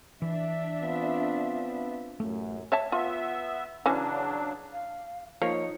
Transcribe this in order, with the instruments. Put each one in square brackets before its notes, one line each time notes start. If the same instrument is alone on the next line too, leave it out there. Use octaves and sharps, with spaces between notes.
[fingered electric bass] E3 [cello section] D4 E5
[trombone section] B3 C4 F4
[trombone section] A1 F#2 [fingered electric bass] A3
[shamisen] C#5 E5 A5
[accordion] B3 E5 [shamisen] F4
[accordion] C#3 F#3 D4 [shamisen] E3 C#4
[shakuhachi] F5
[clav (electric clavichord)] F3 [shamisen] A#3 [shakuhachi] D#4 [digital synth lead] C#5